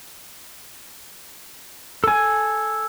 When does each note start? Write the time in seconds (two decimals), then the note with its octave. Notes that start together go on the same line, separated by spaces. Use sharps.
2.04 A4 G#5